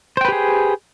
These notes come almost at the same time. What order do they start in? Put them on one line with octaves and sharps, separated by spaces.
C5 G5 B4 G4 G#4